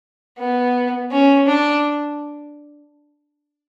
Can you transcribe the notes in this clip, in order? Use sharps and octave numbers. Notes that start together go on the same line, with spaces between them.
B3
C#4
D4